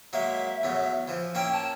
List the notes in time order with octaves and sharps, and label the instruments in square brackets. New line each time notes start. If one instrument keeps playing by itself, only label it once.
[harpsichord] F#3 G#3 A#3 [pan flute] E5
[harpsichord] E2 A2 F#3
E3 F3
[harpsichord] A#3 C#4 E5 [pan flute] G5
[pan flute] A5